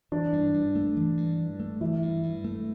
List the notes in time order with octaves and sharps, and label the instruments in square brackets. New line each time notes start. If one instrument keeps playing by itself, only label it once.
[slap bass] E3 [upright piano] D4
[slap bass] G2
G2
A3
E3
G2
G2
A3
[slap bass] E3 [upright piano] E4
[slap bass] G2
G2
A3